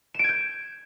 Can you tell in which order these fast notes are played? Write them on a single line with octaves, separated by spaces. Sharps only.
E7 D7 G#6 G6